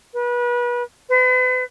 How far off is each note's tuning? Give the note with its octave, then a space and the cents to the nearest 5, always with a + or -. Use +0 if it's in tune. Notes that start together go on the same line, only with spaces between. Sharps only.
B4 -30
B4 +40